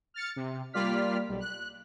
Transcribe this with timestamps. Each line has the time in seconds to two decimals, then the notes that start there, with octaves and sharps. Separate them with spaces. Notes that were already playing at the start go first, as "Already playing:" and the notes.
0.14 F6 A6 C#7
0.36 C3
0.73 G3 A#3 F4 D5 F6 B6
1.29 B1 G3
1.40 F#6